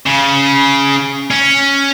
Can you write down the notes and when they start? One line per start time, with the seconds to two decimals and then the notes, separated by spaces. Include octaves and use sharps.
0.06 C#3
1.31 C#4